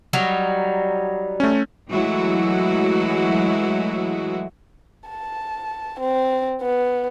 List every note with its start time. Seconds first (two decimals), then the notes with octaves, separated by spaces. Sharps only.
0.13 F#3 G3 D#4
1.40 A3 C#4
1.89 E3 F#3 G#3 A3 E4 F#4
5.09 A5
6.00 C4
6.62 B3